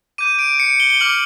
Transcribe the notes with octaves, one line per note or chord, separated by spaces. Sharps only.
D6 G6 D#7
D7
C#7
D7
G7
G7
D6 F6 F#7